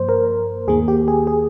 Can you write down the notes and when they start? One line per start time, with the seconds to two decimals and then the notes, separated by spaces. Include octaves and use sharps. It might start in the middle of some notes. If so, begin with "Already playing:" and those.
Already playing: G2 F3 A#3 C5
0.09 A#4
0.68 D#2 D#3 A#3 G#4
0.88 G4
1.08 G#4
1.27 G#4